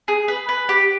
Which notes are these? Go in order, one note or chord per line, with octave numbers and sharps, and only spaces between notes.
G#4
B4
B4
G4